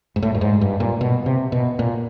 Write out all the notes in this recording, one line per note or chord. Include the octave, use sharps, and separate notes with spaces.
G#2
A2
G2
G#2
G2
A#2
B2
C3
B2
A#2